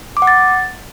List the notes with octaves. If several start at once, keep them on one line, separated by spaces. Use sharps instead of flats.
D6
F#5
A6